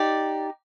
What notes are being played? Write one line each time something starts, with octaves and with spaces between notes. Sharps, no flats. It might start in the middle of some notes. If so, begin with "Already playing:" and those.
Already playing: D#4 G4 D5